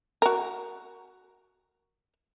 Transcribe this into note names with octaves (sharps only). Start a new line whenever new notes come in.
F#4 A#4